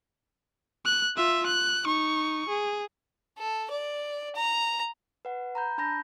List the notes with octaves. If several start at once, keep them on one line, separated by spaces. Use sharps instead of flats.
F#6
F4 E5
F#6
D#4 C#6
G#4
A4
D5
A#5
B4 F#5
A#5 B5 G6
D4 A5 B5 G6 A#6